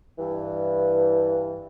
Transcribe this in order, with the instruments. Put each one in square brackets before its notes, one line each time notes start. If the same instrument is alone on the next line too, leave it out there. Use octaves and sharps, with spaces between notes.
[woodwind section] G2 E3